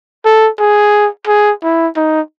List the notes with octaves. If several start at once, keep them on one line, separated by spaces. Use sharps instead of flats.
A4
G#4
G#4
E4
D#4